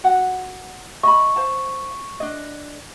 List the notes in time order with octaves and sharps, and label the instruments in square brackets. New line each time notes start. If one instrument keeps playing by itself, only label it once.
[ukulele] F#4 F#5
[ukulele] D#5 B5 [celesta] C#6
[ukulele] C5 F5 A5
D4 D#5